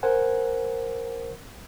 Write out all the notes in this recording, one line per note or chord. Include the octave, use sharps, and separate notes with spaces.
A#4 C5 F#5 G#5